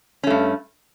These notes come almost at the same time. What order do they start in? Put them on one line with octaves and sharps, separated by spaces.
C#4 A3 G2